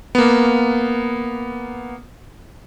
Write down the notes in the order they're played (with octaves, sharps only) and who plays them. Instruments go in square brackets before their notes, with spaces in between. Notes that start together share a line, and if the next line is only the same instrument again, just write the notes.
[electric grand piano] A#3 B3